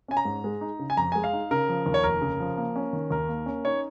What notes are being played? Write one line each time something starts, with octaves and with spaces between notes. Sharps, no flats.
C#4 G#5
A#5
G#2
G#3
D#4
C#3
G#5
F2 A#5
G#3 G#5
F5
D#4
C#3 A#4
F3
D#2
C#5
F1 A#4
C#3
F3
A#3
C#4
D#3
D#2 A#4
A#3
C#4
D#4 C#5